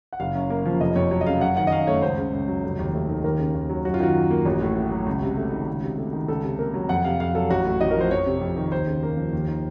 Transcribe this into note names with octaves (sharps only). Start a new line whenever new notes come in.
F#5
F#1 F5
F#2
A#3
F3
F1 D#5
F2 C#5
F#3 C#5
D#5
C#3 F5
F#2 F#5
D#3 F#5
D#5
F#2 F5
A3 C#5
C#2 C5
C#3
C#2
F#3
F1
D#2
A3
D#3
D#2 A#4
C#3
D#2
F#3
F#2 F#4
F4
D#3 F#4
F#2
A#3
A1
A2
A3
F#3
C#2
C3
A3
D#3
C#2
C3
A3
D#3
C#2 A4
C3
A#3 A#4
F#3
F2 F#5
C3 F5
F2 F5
F#3 A4
A1 F#4
A2
A1 D#5
A#4
F3 C5
F2 C#5
C3
F2
D#3
D#2 C5
C#3
A#3
F3
D#2
D#3